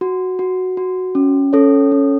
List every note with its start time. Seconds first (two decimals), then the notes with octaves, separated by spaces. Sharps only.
0.01 F#4
0.39 F#4
0.77 F#4
1.15 C#4
1.53 C#4 A4 C#5
1.92 C#4